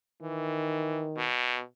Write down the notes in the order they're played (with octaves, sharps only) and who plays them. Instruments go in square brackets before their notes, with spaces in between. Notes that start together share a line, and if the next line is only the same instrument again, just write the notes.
[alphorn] D#3 [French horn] E3
[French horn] B2